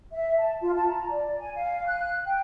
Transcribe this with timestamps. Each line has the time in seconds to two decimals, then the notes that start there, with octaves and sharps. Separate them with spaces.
0.12 E5
0.39 A5
0.60 F4
0.76 A5
0.89 A#5
1.10 D5
1.38 G#5
1.56 F5
1.86 F#6
2.26 G5